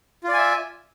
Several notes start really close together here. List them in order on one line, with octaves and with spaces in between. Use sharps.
F4 D5 G#5 E5